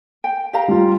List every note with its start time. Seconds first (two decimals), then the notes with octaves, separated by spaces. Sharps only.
0.24 G5
0.53 G4 F5 A#5
0.68 G3 F4